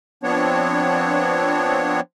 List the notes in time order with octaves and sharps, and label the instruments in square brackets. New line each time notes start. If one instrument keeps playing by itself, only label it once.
[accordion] F3 B3 C4 D4 C#5